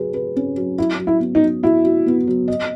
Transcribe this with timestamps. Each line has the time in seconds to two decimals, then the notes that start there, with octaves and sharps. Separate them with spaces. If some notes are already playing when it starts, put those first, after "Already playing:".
Already playing: F#3 G#4 B4
0.14 B4
0.36 C#4
0.57 F#3
0.78 F#3 E4
0.99 F#3
1.07 E4
1.20 B3
1.35 D#4
1.42 F#3
1.63 E4 F#4
1.85 F#4
2.06 B3
2.27 F#3
2.48 D#5